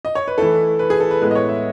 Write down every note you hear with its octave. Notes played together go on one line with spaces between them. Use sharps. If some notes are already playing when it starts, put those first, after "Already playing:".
D#5
C#5
B4
E3 A3 E4 A4
B4
G#4
A4
B4
A2 G#3 B3 E4 B4
D#5
C#5
E5